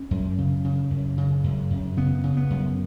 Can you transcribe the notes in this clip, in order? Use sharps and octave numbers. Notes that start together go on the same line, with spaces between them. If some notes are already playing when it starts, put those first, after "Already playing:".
Already playing: C#4
F#2
C#3
C#3
F#2
C#3
F#2
F#2
C#3 B3
C#3
B3
F#2